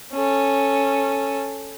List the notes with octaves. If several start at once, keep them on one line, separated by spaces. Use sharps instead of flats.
C#4 A4